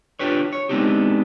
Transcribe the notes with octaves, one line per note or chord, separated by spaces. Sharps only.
D4 F4 G4 B4 C#5
C#5
G#3 B3 C4 D4 D#4 G4